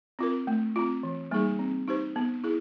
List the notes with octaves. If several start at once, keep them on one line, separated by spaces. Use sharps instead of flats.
C4 F4 A#4
A3
C4 F4
E3
G3 A#3 D#4 G#4
C4
D#4 G4 C5
B3
E4 G#4